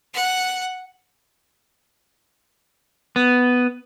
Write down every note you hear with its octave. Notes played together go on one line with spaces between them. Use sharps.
F#5
B3